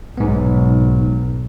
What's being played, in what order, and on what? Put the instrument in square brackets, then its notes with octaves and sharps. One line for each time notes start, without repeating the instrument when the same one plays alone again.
[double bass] B1 [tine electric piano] G#2 B3